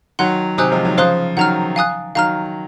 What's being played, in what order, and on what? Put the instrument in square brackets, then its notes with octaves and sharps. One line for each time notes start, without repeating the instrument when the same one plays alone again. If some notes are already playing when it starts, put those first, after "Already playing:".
[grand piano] D#3 F#3 [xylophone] F#5 C6 F#6
[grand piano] C3 D#3 [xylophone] C5 D#5 G#5 D#6 F#6
[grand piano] F3 G#3
D#3 F#3
[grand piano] C#3 F3 [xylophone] C5 F5 C6 D#6 F#6
[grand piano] D#3 F#3 [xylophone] F#5 A#5 F6
[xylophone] F5 G#5 D#6 F#6
[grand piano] D#3 F#3 [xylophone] F5 A#5 F6